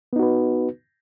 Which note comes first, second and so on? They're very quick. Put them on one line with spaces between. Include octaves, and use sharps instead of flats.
B3 D#4 F#4 B4